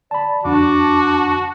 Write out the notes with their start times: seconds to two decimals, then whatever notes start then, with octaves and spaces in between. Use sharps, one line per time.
0.11 D5 A5 B5
0.45 F2 D4 F#4 A5 D6